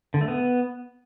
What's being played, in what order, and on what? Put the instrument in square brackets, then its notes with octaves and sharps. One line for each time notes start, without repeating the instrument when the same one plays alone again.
[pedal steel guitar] D3
A3
B3